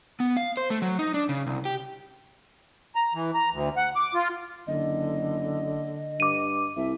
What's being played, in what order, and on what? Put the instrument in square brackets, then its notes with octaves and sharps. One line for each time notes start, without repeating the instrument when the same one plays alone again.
[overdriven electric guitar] B3
F5
C5
A3
F#3
D#4
D4
C#3
C2
G4
[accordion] A#5
E3
A#5
D2
F#5
D6
F4
[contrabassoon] F#1 [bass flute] D3 [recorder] D#5
[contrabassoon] G2 [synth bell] D6 D#7
[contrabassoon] C2 [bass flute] E5